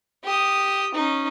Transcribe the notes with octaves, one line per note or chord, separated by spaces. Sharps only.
G4 D#6
C#4 D#4